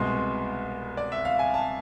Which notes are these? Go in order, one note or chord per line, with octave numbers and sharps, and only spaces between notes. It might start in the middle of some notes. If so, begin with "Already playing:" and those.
Already playing: C2 B2 G#3 C6
D5
E5
F5
G#5
A5